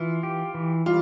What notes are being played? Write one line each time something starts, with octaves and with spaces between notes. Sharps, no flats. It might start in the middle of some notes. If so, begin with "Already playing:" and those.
Already playing: E3 F4
G4
E3
G3 F4